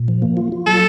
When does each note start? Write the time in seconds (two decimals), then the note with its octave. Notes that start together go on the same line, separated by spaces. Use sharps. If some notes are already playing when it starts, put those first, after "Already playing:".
Already playing: A#2
0.08 F3
0.22 A#3
0.37 F4
0.52 F4
0.67 F#3 A4